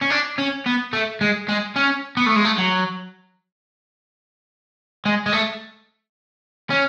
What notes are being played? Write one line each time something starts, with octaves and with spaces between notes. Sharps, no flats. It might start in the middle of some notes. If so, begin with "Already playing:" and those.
C#4
D4
C#4
B3
A3
G#3
G#3
C#4
B3
A3
G#3
A3
F#3
G#3
G#3
A3
C#4